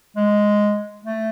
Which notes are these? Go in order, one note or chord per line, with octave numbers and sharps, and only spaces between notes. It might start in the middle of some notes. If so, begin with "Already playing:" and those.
G#3
A3